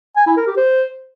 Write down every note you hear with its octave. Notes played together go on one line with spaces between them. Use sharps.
G#5
E4
A#4
G4
C5